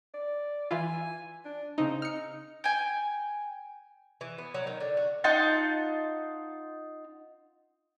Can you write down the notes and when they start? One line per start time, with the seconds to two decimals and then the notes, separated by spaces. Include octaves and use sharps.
0.14 D5
0.71 E3 E4 F4 G#5
1.45 D4
1.78 C#3 C4 D#4
2.02 D#4 F6 C#7
2.64 G5 G#5
4.21 E3
4.38 B3
4.54 F#3
4.67 D#3
4.80 D3
4.97 F#4
5.24 D#4 F4 F#5 A5